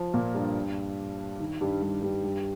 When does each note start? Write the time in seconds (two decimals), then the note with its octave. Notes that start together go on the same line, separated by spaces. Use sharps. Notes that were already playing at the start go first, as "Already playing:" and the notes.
Already playing: F3
0.14 A#2 A#3
0.34 G2 G3
1.40 D#3
1.61 G2 G3
1.82 G2 G3
2.02 G2 G3
2.24 G2 G3